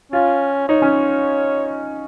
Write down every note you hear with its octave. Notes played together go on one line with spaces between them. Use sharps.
C#4 F4
D#4 C#5
C#4